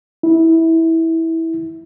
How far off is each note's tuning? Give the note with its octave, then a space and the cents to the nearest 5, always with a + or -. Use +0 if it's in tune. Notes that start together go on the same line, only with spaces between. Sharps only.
E4 -15